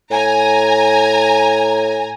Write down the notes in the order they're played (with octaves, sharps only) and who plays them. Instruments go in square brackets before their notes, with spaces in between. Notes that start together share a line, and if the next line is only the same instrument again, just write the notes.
[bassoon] A2 [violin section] G#5 A#5